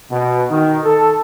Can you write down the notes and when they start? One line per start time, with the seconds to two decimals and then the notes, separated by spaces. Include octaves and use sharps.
0.11 B2
0.50 D#3
0.85 A4